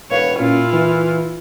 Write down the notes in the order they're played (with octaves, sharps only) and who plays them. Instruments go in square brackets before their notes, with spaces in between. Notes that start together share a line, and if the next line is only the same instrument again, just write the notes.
[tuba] E1 [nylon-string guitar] B4 F5 [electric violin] C#5
[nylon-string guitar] A#2 [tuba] C#4 [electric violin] E4 F4
[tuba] E3